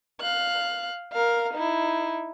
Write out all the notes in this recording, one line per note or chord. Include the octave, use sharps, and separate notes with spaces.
F5 F#6
A#4 F5
D#4 E4